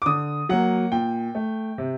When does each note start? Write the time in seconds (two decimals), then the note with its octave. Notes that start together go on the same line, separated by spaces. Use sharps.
0.02 D6
0.06 D3 D#6
0.49 F#3 A#3 F#5
0.92 A#2 G5
1.35 A3
1.78 C3